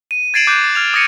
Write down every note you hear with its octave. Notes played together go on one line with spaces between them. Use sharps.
D#7
G#6 A6 C7 D7 E7 F#7
D6 F#6 G6
A6
F6 G#6 F7
D#6 G#6 A#6 C#7 D#7